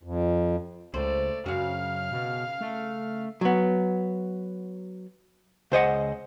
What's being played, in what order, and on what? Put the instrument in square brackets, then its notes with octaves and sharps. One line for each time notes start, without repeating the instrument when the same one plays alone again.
[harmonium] F2
[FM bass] C#2 [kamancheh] A3 D5 [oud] C5
[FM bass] F#2 [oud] C#3 F#4 [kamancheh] F5 F6
[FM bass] B2
A3
[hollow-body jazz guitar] F#3 B3
C#2 C5 D#5 F#5